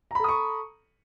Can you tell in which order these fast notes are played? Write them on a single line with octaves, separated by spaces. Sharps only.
A#5 B5 A4 D#6 C#6